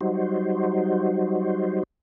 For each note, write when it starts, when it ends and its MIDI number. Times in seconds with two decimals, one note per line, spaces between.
0.01 1.83 54
0.01 1.83 55
0.01 1.83 63
0.01 1.83 66
0.01 1.83 72